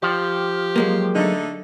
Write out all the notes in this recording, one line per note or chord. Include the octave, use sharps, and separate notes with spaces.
F3 G4
F#3 G#3 A#3
D3 A3 D#4